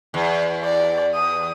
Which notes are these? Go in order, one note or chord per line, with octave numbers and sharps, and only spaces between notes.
E2
D5
D#6